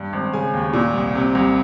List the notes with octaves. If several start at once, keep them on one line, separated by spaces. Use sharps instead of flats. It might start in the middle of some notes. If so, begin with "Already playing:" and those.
Already playing: G2
G#1
C#3 G#5
D#2
A#2
C2
C3
C2